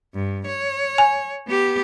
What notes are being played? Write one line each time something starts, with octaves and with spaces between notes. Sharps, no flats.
G2
C#5
G#5
B3 G4